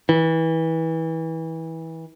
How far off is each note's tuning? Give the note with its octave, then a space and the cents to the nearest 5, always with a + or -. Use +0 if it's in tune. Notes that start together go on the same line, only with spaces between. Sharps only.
E3 -25